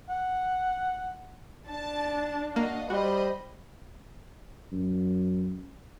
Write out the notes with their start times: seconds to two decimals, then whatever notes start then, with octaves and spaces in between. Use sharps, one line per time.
0.10 F#5
1.69 D4 A5
2.56 A#3 F#4 D#5 F5
2.90 G3 F#4 C5 D#5 B5
4.73 F#2